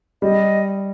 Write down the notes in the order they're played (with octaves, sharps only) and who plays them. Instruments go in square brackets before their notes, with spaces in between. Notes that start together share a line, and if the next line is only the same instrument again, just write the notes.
[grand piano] G3 [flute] D#5